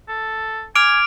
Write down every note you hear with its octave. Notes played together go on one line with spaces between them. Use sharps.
A4
G#5 D6 F6 D7 F7